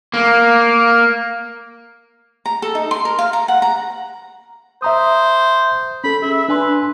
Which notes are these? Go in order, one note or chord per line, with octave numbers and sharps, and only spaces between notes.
A#3
A#5
A4
D#4
C6
A#4
F5
A#5
F#5
A#5
C5 E5 A#5 D#6
C#4 A4 B5
G#4 E5
D4 B4 G#5 C6